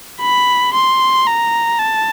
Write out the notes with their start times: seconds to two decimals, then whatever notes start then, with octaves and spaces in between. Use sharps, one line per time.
0.21 B5
0.74 C6
1.27 A#5
1.79 A5